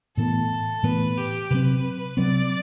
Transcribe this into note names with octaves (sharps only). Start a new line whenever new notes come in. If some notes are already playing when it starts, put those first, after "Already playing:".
A2 E3 B3 A4
A2 E3 B3 B4
G4
C3 F#3 C4 B4
C3 F#3 C4 D5